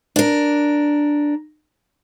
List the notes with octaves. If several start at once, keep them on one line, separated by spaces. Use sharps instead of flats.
D4 A#4